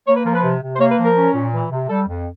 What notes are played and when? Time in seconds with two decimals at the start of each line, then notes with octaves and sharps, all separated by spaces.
0.07 A#3 C#5
0.16 B4
0.26 F3 A#4
0.34 B4
0.44 C3
0.62 C3
0.75 C5
0.80 A#3 C#5
0.92 B4
0.98 F3
1.05 A#4
1.17 C#4
1.35 A#2
1.53 E3
1.71 C3
1.89 G3 A4
2.08 F2